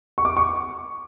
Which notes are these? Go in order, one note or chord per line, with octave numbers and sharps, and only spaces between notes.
C#6
D6
C#6